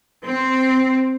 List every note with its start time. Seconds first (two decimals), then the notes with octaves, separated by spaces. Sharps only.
0.25 C4